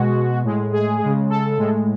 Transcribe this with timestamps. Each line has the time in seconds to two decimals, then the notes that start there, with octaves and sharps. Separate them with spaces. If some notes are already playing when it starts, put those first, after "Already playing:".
Already playing: B2 G#3 F#4
0.43 A2 G#3
0.72 G#4
1.01 C#3 G#3
1.29 A4
1.58 A2 G#3